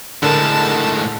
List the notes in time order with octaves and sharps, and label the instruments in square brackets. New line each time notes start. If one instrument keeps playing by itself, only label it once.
[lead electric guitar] A2 G#3 [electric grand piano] D3 A#4 [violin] A5